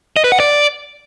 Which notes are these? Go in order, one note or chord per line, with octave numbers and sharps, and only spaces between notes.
D#5
B4
F#5
D5